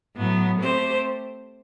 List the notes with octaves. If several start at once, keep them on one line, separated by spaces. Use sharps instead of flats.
A2 F#3 B3
A3 C4 G4 C5